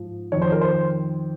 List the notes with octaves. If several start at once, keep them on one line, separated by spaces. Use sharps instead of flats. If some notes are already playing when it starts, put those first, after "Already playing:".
Already playing: G#2 F3
F2 D#3 C#5
C5
A#4
C5